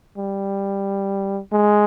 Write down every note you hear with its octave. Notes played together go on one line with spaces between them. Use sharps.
G3
G#3